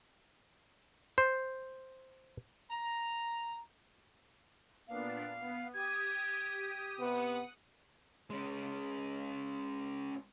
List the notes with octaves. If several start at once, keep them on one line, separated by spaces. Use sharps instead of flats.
C5
A#5
A#2 B3 D4 F5
B3
G4 D#6 G#6
C3 B3 F#5 D#6
G#3 C#4